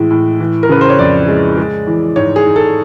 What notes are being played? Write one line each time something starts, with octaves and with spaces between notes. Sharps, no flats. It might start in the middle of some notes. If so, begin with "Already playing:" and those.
Already playing: A2 E3 G#3
A2
E3
A#4
C#3 B4
C5
C#5
F2 D5
G#3
G#3
E3
G#2 C#5
G#4
G#2
A4